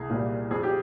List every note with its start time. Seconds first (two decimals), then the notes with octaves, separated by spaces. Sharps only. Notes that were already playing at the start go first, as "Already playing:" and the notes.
Already playing: C2 G#4
0.10 A#2 G3
0.51 F2 G#4
0.63 G4